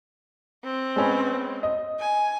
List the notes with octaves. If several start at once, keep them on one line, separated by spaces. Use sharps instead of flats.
C4
G#3 B3 C#4
D#5
G#5